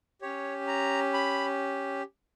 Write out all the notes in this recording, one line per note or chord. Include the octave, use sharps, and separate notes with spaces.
C#4 G4 C#5
A#5
B5